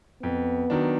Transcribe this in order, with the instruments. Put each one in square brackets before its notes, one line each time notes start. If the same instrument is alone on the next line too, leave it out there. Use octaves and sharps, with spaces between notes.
[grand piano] F2 [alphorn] B3
[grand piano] D#3 F#3 D4